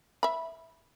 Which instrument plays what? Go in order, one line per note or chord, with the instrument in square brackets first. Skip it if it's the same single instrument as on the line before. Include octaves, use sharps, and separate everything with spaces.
[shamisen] E5 B5